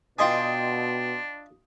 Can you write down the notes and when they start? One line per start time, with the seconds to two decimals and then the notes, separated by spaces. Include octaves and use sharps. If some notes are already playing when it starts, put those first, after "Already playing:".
0.19 B2 D4 F4 D#5 G5 G#5 C6 D#6